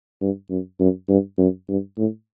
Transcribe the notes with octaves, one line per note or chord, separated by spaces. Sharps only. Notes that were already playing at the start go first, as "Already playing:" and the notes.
G2
F#2
F#2
G2
F#2
G2
A2